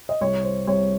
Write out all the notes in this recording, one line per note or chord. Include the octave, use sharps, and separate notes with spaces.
D#5
C2 C#5
C5
C2 C#5